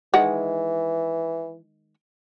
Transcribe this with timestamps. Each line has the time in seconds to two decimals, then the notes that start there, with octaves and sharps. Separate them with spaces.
0.14 D#3 E3 G#3 F#5